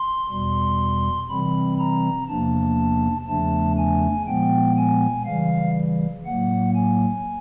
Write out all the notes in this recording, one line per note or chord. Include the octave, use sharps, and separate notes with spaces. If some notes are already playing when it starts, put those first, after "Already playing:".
Already playing: C6
E2 B2 G3 C6
C3 E3 G3 C4 B5
A#5
E2 C3 F3 A#3 D4 A5
E2 C#3 F3 A3 D4 A5
G#5
A#2 F3 G#3 B3 G5
G#5
C#3 E3 G3 F5
A2 F#3 A#3 F#5
G#5